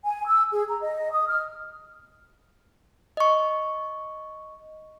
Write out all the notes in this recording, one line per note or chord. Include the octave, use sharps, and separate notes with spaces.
G#5
E6
G#4
A#5
D#5
D#6
F6
D#5 C#6